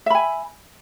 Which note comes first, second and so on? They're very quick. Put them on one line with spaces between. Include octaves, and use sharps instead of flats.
E5 B5 G#5